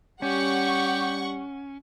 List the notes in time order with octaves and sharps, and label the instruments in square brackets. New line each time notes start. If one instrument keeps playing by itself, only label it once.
[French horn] G3 [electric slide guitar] C#4 [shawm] G4 [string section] F#5 C#6